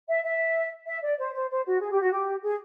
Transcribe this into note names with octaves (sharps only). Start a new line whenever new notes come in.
E5
E5
E5
D5
C5
C5
C5
F#4
G#4
G4
F#4
G4
G#4